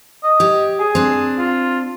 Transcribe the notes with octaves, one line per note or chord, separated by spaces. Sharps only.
D#5
G4 C#5
G#4
C4 D4
F4